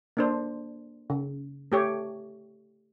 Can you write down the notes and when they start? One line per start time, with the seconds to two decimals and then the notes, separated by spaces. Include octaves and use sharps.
0.17 A#3 D4 C5
1.10 C#3
1.72 A3 G4 C#5